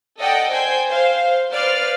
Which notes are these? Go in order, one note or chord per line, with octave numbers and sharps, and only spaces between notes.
A4 D5 D#5 F#5 G5
C5 G5 G#5 G6
C5 F5
B4 C5 D5 F5 F6